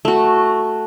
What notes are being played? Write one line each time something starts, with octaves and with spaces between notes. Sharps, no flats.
A3 F#4